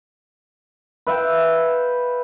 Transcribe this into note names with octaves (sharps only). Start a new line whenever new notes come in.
B4 E5 F5 G5